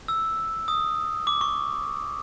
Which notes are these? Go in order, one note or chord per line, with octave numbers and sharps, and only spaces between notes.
E6
D#6
D6
C#6